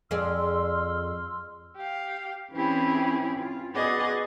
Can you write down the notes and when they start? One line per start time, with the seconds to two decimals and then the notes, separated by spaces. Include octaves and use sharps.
0.11 F2 G#4 D5 C6 E6 F6
1.76 G4 F5
2.53 E3 C4 C#4 E4 G4 G#4
3.39 F4
3.73 B3 F#4 G#4 D5 D#5 F#5